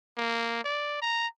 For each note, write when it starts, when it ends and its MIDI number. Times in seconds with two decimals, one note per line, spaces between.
0.17 0.59 58
0.64 1.00 74
1.02 1.27 82